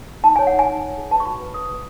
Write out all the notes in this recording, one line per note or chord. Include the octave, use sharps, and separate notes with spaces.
D#4 A5
C#5 G#5
F#5
D#4
G#5
D#4
C#5
G#4
B4 A5
C#6
F#4 B5
B4
B4 D#6
B4